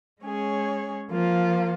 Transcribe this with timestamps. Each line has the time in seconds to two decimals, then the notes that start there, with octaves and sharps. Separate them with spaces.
0.22 G#3 C#4 G#4 C#5
1.11 F3 A#3 F4